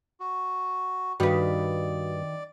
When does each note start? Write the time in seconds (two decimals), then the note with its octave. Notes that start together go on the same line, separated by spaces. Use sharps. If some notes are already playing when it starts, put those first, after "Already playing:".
0.20 F#4
1.20 G2 D#3 F#4 B4 D5 F5